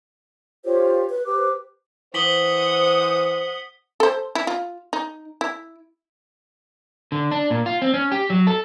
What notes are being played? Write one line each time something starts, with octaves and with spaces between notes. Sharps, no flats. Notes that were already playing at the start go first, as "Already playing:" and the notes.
F4 G4 C5 C#5
B4
G4 B4 C5 D6
E3 C5 F#5 D#6 B6 F#7 G7
A4 C5
E4
F4
D#4
E4
D3
D4
A#2
F4
C4
C#4
G4
F#3
A4